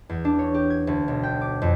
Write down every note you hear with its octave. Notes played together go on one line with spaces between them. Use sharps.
E2
D4
C#5
G4
G#6
D2
B1
G5
D6
F2